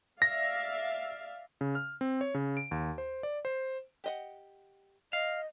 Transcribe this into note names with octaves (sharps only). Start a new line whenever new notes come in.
D5 E5 F5 A#6
C#3
F6
C4
C#5
C#3
D7
D#2
C5
D5
C5
G4 D#5 F#5
D#5 F5